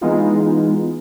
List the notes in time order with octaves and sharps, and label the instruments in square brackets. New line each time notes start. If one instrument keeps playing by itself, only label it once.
[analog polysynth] E3 G#3 B3 D#4 F4